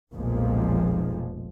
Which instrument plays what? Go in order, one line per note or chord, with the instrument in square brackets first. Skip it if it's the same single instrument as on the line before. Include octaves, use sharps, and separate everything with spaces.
[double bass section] F1 B1 A#2 F3 G#3